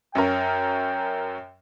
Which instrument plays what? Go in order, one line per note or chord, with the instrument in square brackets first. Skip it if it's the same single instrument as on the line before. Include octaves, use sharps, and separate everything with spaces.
[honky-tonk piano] F#2 C#4 A#4 [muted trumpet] G5